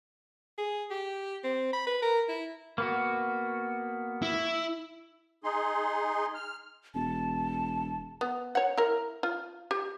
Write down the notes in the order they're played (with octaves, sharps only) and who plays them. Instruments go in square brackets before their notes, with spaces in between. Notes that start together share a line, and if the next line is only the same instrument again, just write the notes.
[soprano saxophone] G#4
G4
C4
B5
B4
A#4
E4
[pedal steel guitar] A#3 B3 F#4
[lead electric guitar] E4
[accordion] D#4 G#4 C6
F6
[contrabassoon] E1 [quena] A5
[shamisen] B3
C#5 F#5
E4 A#4
F4
G4